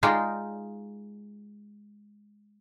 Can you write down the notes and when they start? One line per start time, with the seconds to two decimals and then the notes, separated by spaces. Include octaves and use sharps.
0.03 G#3 D#4 F4 D5 G5